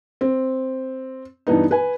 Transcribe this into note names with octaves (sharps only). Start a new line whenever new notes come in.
C4
G2 E3 B3 D#4
B4 G#5